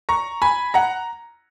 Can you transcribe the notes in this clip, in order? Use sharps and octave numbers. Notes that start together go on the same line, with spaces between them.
A#5 C#6
G#5 B5
F#5 A#5